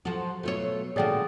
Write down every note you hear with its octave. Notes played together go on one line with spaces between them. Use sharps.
F3 F#3 F#4 A4
B2 F#3 A3 F4 C#5
A#2 D3 F3 A3 F#4 G#4 D5 G5